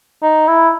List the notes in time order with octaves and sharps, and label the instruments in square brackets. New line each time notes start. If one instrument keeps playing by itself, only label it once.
[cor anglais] D#4
E4